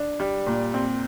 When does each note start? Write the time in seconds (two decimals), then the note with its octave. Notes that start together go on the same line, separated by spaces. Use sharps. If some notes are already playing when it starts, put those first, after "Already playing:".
Already playing: D4
0.20 G3
0.47 A#2
0.74 C4